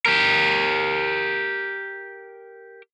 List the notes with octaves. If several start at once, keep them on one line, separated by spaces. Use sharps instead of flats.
G4 A#4